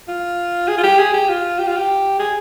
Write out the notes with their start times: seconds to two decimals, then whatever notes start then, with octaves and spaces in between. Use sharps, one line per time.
0.08 F4
0.68 G#4
0.77 F4
0.83 G4
0.99 G#4
1.14 G4
1.29 F4
1.59 G4
1.68 F4
1.77 G4
2.19 G#4